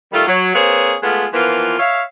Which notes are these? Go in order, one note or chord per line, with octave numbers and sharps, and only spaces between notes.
D#3 G3 A3 F4
F#3
A#3 C4 G#4 B4 C#5
G#3 A3 B3 F4
E3 F3 A#3 B3 F4
C#5 E5 F5